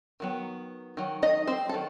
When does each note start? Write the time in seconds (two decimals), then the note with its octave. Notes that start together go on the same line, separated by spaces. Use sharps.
0.20 D#3 F#3 B3
0.97 D#3 F#3
1.22 D#4 D#5
1.47 C4 C5
1.69 A4
1.74 D#3 F#3